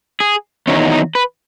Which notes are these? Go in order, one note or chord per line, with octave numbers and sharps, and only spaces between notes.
G#4
E2 D#3 F#3 C#4
D#4
B4